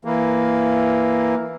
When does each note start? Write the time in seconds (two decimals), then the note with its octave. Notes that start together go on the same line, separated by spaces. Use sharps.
0.05 E3 A#3